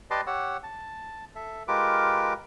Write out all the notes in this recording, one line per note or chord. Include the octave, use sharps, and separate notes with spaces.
G4 B4 D5 D#5 A5 C6
G4 C#5 F#5 E6
A5
A4 E5
G#3 F4 G4 A#4 B4 D6